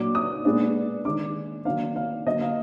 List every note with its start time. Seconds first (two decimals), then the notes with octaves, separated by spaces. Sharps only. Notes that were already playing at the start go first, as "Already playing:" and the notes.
Already playing: A#2 F#3 D4 D6
0.15 D#6
0.45 A#2 G#3 B3 D4
1.05 D#3 G#3 D4 D6
1.65 D#3 F#3 A#3 D4 F5
1.96 F5
2.26 D3 F#3 A#3 D#5
2.41 F5